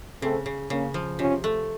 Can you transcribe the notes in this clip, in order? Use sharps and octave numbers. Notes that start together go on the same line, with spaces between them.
C#3 A3 C4
C#3
C#3 A#3 C#4
F3
C3 C#4 F4
A3